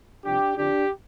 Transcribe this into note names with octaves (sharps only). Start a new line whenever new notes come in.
C2 C3 F3 D4 G4
F2 D3 F3 D4 G4